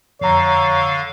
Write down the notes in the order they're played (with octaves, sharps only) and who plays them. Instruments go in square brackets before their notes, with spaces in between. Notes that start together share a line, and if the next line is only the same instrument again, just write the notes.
[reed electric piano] F2 A#5 [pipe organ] D3 F5 [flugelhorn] C#5